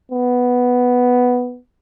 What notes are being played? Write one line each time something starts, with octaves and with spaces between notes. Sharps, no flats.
B3